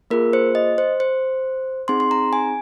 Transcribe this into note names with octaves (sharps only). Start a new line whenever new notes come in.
A#3 F4 G#4 A#4
C5
D#5
C5
C5
C4 D#4 G#4 C6
C6
A#5
G#5